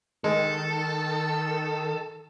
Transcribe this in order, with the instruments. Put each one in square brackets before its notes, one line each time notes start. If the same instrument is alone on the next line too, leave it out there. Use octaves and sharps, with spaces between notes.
[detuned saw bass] D#3 [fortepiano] G#3 [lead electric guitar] A4